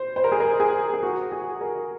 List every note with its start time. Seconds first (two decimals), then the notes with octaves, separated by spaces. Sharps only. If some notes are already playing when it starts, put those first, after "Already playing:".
Already playing: C5
0.16 C5
0.24 A#4
0.32 G#4
0.40 A#4
0.60 G#4
0.94 G#4
1.03 F#4
1.32 G#4
1.61 A#4